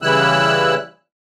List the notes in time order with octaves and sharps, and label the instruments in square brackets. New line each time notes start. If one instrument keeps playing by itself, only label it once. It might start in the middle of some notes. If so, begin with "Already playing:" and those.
[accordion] C#3 E3 G3 E4 E6 F#6